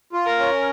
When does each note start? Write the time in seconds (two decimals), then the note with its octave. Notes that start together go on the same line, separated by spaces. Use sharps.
0.13 F4
0.26 A#4
0.39 C#4